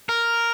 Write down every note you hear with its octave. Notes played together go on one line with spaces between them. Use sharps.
A#4